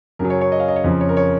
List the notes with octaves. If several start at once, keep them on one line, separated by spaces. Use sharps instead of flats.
F#2 C#3 F#3 A#4
C#5
C#5
D#5
F5
D#5
C#5
F2 C#3 F3
C#5
A#4
C#5